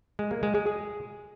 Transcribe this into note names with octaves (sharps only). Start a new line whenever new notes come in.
G#3
A#3
G#3
G#3
G#4